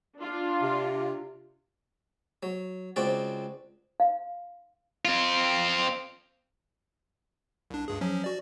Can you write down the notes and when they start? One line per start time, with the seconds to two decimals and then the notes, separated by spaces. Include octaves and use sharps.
0.18 D4 F4
0.62 C3
2.43 F#3
2.96 C#2 C4 F#4 D5
4.00 F5
5.05 C4 F4
7.70 C2 D4
7.88 C#2 G2 G#4
8.01 F3 F#3 C#4
8.24 F#4 D5